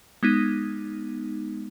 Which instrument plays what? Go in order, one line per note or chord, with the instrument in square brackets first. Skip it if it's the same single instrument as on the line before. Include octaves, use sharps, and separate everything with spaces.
[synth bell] G#3 B3 D#4